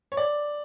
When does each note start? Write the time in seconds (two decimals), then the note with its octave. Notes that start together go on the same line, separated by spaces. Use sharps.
0.12 C#5
0.17 D5